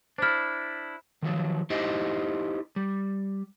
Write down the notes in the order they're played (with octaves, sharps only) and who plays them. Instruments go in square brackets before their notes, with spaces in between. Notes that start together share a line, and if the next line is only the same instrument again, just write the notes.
[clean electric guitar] D4 E4 [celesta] C5 F6
[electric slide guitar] D#3 F3 F#3
D#4 E4 G4 C5 D#5
G3